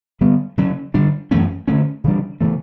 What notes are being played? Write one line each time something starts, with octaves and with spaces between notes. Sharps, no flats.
D3 G3 B3
C#3 F#3 C#4
D3 G3 D4
F#2 E3 A3 C#4
D3 A3 C#4
C#3 E3 G3 D4
C#3 E3 A3